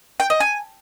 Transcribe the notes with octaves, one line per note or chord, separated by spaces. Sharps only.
G5
D#5
G#5